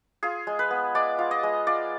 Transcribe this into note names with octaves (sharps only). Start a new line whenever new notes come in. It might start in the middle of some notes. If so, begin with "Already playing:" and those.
F4 G#4
G#3
B4
B3
G#3 D5
F4
D#5
G#3
F4 D5